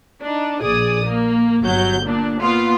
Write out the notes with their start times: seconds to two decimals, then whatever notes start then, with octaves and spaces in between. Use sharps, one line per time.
0.23 D4 D#4
0.62 A#1 G#4 D5 D#6
1.05 A#3
1.62 G1 F#3 G6
2.03 A#2 D4
2.41 A#2 B3 F4